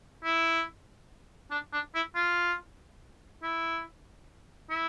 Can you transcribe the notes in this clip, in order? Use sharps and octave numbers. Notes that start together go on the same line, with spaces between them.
E4
D4
D4
E4
F4
E4
E4